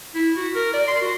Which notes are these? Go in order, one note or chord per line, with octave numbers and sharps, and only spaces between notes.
E4
F#4
A#4
D5
C6
F#4